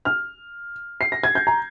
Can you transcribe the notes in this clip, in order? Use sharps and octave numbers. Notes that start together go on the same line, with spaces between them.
F6
C7
A#6
G#6
G6
A#5